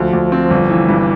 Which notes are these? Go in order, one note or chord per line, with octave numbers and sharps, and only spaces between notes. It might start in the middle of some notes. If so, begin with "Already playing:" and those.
Already playing: D2 F3
D2
C4
G1
E3
G2